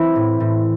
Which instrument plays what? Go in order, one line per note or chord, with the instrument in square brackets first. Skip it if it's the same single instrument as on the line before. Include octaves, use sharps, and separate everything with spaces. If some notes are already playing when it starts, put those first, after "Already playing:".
Already playing: [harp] E3 C4 E4
A2
A2